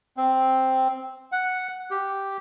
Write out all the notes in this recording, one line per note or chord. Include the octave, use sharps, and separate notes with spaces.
C4
F#5
G4